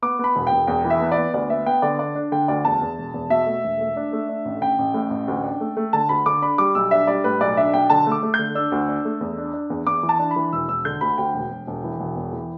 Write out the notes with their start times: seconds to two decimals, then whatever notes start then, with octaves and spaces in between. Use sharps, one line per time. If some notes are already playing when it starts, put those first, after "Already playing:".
0.02 B3 D6
0.19 B3 B5
0.36 E1
0.47 E1 G5
0.67 E2 G5
0.85 E3
0.90 E5
1.00 B3
1.12 D5
1.17 B3
1.34 D2 D5
1.50 B3 E5
1.66 B3 G5
1.82 D3 D5
1.99 D4 D5
2.15 D4
2.32 D3 G5
2.48 D2 D5
2.65 E2 A5
2.81 E2
2.98 E1
3.14 E2
3.30 B2 E5
3.47 A3
3.64 E1
3.80 A3
3.96 D4
4.13 A3
4.29 D4
4.45 A1
4.61 A1 G5
4.79 A1
4.94 A2
5.10 A1
5.28 D2
5.44 D4
5.61 A3
5.77 A3
5.93 D3 A5
6.09 D2 B5
6.26 D3 D6
6.42 D4 B5
6.58 G3 D6
6.75 B1 E6
6.91 D4 E5
7.07 G3 D5
7.24 A2 B4
7.41 B1 D5
7.57 D4 E5
7.73 B1 G5
7.90 D3 A5
8.07 A3
8.12 D6
8.23 A3
8.34 G6
8.39 D3
8.55 D4 E6
8.72 D2
8.89 D4
9.05 A3
9.21 E2
9.38 D4
9.53 D4
9.70 E2
9.86 E2 D6
10.03 E3
10.09 A5
10.19 D4
10.31 B5
10.36 E3
10.52 E1 E6
10.68 E1 E6
10.85 D3 G6
11.01 D2 B5
11.18 D2 G5
11.34 E1
11.50 E1
11.67 E1
11.84 E3
12.00 E1
12.16 E2
12.33 E3